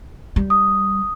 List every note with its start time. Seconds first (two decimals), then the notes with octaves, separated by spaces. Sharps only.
0.36 G3
0.50 D#6